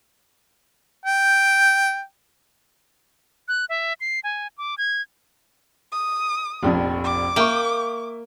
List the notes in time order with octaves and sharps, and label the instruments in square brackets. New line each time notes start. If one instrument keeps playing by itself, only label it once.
[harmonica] G5
[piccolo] F#6
E5
C7
G#5
D6
G#6
[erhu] D#6
[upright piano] F1 A#1 F2
[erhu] D6
[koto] A#3 G5 [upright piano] E5 C#6